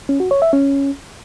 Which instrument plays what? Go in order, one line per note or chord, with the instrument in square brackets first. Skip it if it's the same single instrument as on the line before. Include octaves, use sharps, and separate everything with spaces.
[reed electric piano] C#4
F#4
C#5
E5
C#4